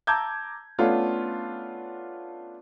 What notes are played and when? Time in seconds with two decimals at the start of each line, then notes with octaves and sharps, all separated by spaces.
0.07 A5 A#5 D6 E6 G6 G#6
0.79 A3 B3 C#4 D4 F4